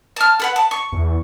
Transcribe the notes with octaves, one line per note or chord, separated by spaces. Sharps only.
A5 F6
A4 B4 F#5
A5
C#6
E2